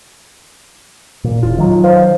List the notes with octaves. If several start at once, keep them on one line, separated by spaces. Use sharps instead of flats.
A#2
E1 F4
D#3 F#3
C5 F5